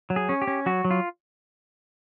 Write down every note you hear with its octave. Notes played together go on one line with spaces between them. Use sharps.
F#3
G#4
C#4
G4
C#4
F#3 F#4
F#3
F4